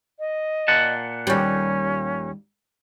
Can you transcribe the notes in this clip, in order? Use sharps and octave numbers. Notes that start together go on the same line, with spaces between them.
D#5
A#2 F#5 A5
D#2 G3 C#4